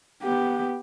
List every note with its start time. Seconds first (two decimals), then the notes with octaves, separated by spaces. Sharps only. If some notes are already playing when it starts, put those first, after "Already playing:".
0.23 B3 G4